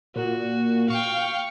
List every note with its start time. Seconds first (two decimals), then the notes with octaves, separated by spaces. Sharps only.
0.16 A#2 F#4
0.90 F5 G5 C#6